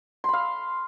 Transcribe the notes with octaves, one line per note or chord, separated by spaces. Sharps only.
F5 B5 C6